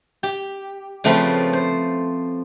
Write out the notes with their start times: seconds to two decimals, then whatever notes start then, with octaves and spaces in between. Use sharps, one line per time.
0.23 G4
1.04 C#3 F3 A3 C4 F4 B4
1.53 C5